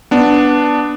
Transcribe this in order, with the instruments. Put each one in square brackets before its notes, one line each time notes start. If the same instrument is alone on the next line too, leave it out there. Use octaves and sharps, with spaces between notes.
[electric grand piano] B3 D4